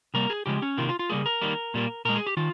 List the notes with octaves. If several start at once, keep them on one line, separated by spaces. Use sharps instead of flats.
C3 G3 A#3 A#4
G#4
C#3 F3 G#3 G4
C#4
C3 D#3 A#3 F4
F4
F4
C#3 G3 A#3 G#4
A#4
D#3 G3 A#3
A#2 G3 A#3
A#2 G#3 A#4
G#4
G4
D#3 F4